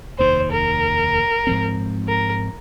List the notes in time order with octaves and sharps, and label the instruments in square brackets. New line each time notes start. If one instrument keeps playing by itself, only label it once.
[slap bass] F1 D#2 D#3 [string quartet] C5
[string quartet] A#4
[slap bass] G#2 F3 C4
[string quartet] A#4